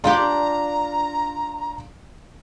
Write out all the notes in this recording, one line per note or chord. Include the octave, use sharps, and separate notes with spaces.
D4 F4 G4 F5 A#5 C6